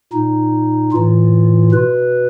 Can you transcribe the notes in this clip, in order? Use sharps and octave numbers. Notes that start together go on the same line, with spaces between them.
A#2 D#4
A2 E3 F4
B2 B4